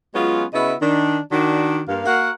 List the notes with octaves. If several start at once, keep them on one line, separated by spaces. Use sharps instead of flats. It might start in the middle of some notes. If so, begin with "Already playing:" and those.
F#3 G#3 B3 C#4 F4
C#3 B3 E4 F#4 D#5 E5
D#3 D4
D#3 D4 F#4
G2 A#3 F5
A#3 F#4 A#4 F5 F#5